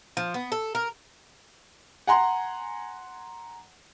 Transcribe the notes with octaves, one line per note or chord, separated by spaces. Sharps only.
F3
B3
A4
A#4
F#5 G#5 A#5 C6